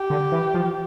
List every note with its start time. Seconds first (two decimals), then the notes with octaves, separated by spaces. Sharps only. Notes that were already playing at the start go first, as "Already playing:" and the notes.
Already playing: G4
0.10 D3
0.32 E3
0.54 F3